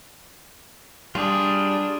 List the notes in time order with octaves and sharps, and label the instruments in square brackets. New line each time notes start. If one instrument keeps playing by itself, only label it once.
[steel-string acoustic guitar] G3 [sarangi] D4 [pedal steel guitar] F4 G#4